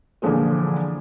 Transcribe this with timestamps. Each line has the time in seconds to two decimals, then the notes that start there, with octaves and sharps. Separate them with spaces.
0.22 A#2 D3 E3 F3 G#3 A3